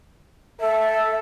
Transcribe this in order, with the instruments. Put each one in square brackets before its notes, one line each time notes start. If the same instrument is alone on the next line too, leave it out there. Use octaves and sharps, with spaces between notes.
[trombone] A4 [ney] E5